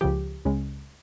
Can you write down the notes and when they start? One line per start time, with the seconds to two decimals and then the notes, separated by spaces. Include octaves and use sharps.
0.01 C#2 C#3 F3 G4
0.45 C#2 C#3 G#3